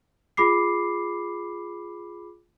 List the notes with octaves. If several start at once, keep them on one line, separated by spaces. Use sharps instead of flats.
F4 G#4 B5 D6 C7